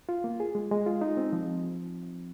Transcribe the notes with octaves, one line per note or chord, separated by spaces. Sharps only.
F4
A#3
G#4
G#3
G#3
F4
D#4
C4
F3